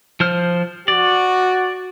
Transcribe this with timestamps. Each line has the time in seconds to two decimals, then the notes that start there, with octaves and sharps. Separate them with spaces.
0.20 F3 C5 F6
0.88 F#4 D5